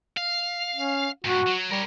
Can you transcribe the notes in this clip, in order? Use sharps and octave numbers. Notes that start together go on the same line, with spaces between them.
F5
C#4
G2 A#2 F#4
F#3
G3 A#4 C#5